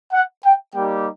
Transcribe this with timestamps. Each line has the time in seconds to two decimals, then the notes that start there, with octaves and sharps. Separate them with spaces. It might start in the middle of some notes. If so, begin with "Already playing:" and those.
0.13 F#5
0.44 G5
0.75 G3 A#3 D#4 G4 G5